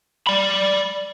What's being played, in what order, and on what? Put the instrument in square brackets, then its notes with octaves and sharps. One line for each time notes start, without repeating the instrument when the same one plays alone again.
[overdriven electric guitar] D5 B5